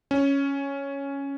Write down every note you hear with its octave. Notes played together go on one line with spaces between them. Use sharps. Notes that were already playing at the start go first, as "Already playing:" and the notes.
C#4